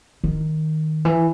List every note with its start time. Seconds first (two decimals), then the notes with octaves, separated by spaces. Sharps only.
0.24 D#3
1.05 E3